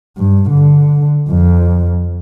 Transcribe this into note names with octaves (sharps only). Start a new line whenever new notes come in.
G2
D3
F2